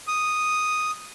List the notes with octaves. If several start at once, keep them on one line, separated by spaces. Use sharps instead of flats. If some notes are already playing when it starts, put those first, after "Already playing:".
D#6